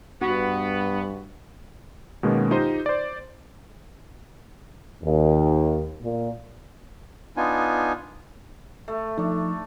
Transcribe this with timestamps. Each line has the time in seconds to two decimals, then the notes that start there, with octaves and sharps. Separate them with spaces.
0.21 G2 B3 F#4
2.23 B2 D#3 G#3 A#3 B3 C#4
2.51 D#4 F4 G4 C5 D#5
2.86 C5 D5
5.04 D#2
6.03 A#2
7.37 B3 D4 D#4 F4 G#5
8.88 A3
9.18 F3 A3 D4 D#4